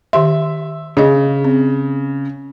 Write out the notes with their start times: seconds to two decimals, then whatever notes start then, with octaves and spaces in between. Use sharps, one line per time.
0.13 D#3 G4 E5 C6
0.97 C#3 G#4 D#5
1.44 C4